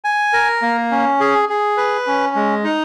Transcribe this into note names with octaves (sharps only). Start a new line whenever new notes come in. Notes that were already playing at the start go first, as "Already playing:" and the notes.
G#5
A#4
A#3
C#4
G#4
G#4
B4
C#4
G#3
D#4